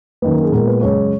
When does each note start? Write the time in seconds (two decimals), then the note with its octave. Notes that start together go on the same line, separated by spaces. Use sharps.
0.22 F#2 D#3 A#3 B4
0.33 A#4
0.43 G#4
0.51 A#2 G#3 B3 A#4
0.67 B4
0.81 F#2 C#3 G#3 C#4 C#5